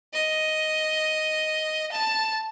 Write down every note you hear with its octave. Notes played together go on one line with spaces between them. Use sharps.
D#5
A5